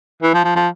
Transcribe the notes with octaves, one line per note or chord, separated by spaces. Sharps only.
E3
F3
F3
F3